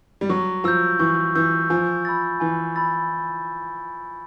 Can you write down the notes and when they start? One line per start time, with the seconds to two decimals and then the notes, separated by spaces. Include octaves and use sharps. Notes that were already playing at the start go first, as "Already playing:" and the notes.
0.21 G3
0.29 F#3 C#6
0.64 F3 E6 G6
0.99 E3 C#6
1.35 E3 E6 G6
1.70 F3 G#5
2.05 B5 E6 A6
2.40 E3 G#5
2.76 B5 E6 A6